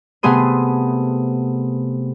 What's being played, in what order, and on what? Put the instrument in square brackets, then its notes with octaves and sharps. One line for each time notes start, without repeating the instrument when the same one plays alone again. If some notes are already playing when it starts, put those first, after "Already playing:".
[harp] C3 A3 B3 G#4 C6 D#7